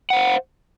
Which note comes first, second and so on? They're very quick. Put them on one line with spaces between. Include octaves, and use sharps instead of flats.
F#5 C5 F5